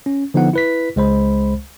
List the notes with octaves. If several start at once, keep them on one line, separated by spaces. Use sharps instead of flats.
C#4
D3 F3 B3 D#4 F#5
E4 B4 B6
C#2 G#3 C5 B5